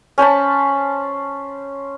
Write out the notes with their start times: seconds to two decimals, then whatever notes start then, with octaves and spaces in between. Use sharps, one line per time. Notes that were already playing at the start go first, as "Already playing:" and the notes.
0.18 C#4 C5 A5 B5